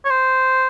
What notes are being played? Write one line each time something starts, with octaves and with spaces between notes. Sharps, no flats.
C#5
C5